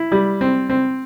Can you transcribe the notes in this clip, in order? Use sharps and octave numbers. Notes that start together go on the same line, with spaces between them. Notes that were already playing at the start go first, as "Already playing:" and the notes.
Already playing: E4
G3
C4
C4